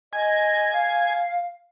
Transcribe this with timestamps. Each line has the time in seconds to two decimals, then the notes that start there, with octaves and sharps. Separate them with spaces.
0.13 D#5 G#5
0.72 F5